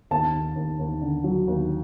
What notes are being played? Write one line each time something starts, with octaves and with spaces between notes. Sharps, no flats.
D#2 A5
D#2
D#2
D#2
D3
F#3
D#2